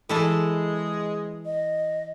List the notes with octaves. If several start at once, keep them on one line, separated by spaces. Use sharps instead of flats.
E3 G#3 A4 A5
D#5